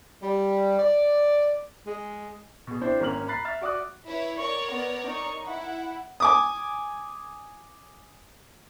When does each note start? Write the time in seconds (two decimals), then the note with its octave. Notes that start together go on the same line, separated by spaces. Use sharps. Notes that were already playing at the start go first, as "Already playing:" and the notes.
0.22 G3
0.79 D5
1.87 G#3
2.67 B2 G#4
2.81 C4 D4 E4 C5
3.00 G#1 A#3 C#4 F6 F#7
3.28 A#5 B5 F#6 A6 C7
3.45 E5 F6 A6
3.61 F#4 D5 D6 D#6 F#6
4.05 E4 B4 C#5
4.38 A#4 C#5 D5 C#6
4.72 B3
5.07 D#4 C#6
5.47 E4 F#5
6.20 G#5 D6 D#6